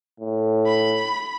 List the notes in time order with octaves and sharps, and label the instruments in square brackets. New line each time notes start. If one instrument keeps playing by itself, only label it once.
[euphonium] A2
[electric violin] B5